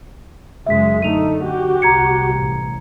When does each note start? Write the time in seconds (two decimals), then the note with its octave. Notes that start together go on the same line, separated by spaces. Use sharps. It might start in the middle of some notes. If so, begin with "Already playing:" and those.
0.66 F#2 C#3 G#3 E5 B6
1.02 D3 A3 D#4 D#7 F7
1.43 F#4 G4
1.82 C2 A#5 G#6 C#7
2.36 A1